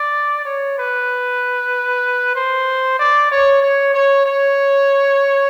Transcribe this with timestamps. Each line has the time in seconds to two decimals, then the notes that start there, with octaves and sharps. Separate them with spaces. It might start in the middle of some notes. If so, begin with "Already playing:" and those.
Already playing: D5
0.46 C#5
0.78 B4
2.36 C5
2.99 D5
3.32 C#5
3.62 C#5
3.94 C#5
4.26 C#5